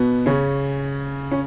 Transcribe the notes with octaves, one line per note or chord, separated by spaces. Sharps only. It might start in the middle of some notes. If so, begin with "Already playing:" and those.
Already playing: B2 B3
C#3 C#4
C#4